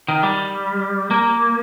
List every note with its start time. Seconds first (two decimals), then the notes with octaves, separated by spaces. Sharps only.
0.08 D#3
0.23 G3
1.11 A#3